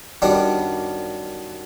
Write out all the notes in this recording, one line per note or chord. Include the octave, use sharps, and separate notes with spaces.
F#2 D#3 G3 B3 D4